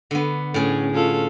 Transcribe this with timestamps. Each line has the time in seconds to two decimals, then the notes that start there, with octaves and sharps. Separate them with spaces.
0.11 D3 B3
0.54 A2 C#4 G#4
0.93 C#4 F4 A4